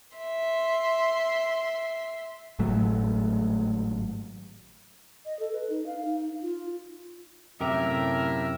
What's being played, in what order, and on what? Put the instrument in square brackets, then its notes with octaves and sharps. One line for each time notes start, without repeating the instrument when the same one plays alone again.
[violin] E5 C6
[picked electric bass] G#1 A2 F#3 A3
[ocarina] D#5
A4
B4
D#4
F5
D#4
F4
[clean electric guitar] F#2 C3 G4 [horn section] A2 A#4 E5